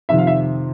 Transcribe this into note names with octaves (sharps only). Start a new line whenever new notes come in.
F2 C3 D#3 E5
F5
E5